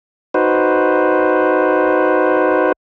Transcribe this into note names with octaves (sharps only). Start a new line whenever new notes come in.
D#4 F#4 B4 C5